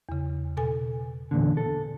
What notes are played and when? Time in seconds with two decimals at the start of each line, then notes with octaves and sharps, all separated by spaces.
0.09 E2 C#3
0.57 B2 A4 G#5
1.31 E2 A#2 D3
1.57 A4